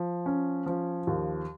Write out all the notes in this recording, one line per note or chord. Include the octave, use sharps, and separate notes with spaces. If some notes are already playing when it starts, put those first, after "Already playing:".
Already playing: F3
C#4
F3
D#2